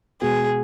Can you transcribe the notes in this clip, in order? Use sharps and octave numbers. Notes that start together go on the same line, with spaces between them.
B2 G#3 B3 F#4 G#4